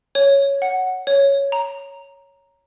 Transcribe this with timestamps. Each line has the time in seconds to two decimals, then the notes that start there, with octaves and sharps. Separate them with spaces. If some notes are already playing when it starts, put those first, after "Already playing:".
0.15 C#5
0.62 F#5
1.07 C#5
1.52 A#5